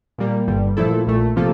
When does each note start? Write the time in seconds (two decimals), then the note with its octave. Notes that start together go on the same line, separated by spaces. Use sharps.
0.18 A#2 G3 A#3
0.47 G1 G2 D3 G3
0.77 A#2 F3 A3 E4 A4
1.07 A#1 A#2 A3
1.36 C3 F3 A#3 F4 A4